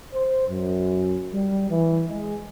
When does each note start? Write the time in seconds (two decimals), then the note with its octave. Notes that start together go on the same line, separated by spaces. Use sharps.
0.14 C5
0.48 F#2
1.33 G3
1.70 E3
2.08 G#3